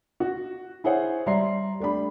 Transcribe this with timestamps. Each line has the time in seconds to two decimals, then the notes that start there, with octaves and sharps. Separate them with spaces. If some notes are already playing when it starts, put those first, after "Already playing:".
0.20 F#4
0.84 E4 G#4 C5 C#5 F#5
1.26 G3 E5 A#5 C6 C7
1.80 A3 D4 G4 B5